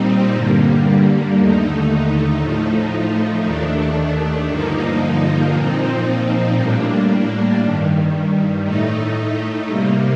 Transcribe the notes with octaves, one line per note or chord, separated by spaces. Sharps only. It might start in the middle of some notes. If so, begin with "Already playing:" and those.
Already playing: A#2 G3 C4 D#4
G2 D3 G3 A#3
D#2 D3 A3 D#4
A2 F3 A3 D#4
D#2 D#3 A3 D4
G2 D3 F3 A#3 D#4
A#2 F3 C4 D#4
A2 G3 A#3 D4
G2 D#3 G3
A2 A3 D#4
C3 G3 A#3